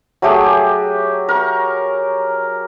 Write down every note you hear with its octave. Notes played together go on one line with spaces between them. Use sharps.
F#3 A3 G4 G#4
A#4 C#6